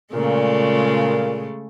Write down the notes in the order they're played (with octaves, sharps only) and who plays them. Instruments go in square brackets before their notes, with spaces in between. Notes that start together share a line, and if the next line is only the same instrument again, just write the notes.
[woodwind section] A#2 [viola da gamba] C#3 G#3 A3